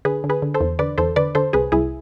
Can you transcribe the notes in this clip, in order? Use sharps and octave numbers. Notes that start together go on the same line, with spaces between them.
D3 G#4 B4
D3
G#4 B4
D3
A4 C5
E2
D3 B4 D5
E2 A4 C5
D3 B4 D5
D3 A4 C5
C2 G#4 B4
C2 E4 G#4